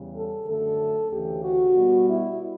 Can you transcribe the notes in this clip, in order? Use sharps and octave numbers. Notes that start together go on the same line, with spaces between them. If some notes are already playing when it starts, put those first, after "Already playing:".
Already playing: E2 C#3 G3
A4
F#2 D3 A3 A4
D2 C#3 E3 G4
F#4
B2 G3 B3
E4